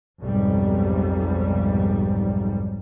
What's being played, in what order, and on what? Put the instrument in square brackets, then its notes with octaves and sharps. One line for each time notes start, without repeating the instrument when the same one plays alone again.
[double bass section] B1 F2 G#2 G3